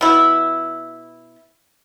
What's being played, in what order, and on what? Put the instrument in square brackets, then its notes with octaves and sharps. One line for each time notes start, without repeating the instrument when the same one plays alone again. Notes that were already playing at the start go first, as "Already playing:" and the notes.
[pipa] B2 E4